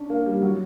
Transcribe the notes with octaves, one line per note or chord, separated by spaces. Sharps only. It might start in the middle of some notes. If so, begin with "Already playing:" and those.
Already playing: C#4 D4
A#3
G3
F#3